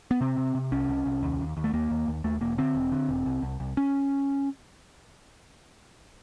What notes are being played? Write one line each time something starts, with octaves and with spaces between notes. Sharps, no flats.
B3
C3 C4
C3
C3
C2 C#4
C2
C2
D#2
D#2
D#2
A3
D#2 A#3
D#2
D#2
D#2 A3
E1 A#3
D3 C4
E1
D3
E1
C2
C2
C2
C#4